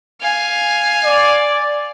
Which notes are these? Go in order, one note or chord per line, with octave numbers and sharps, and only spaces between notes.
F5 G#5
D5